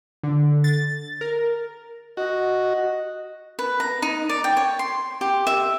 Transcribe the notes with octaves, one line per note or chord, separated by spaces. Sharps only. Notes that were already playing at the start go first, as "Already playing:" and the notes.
D3
A6
A#4
F#4 D#5
B4
A#5
D#4
D5
G5
C#5
C6
G4
E5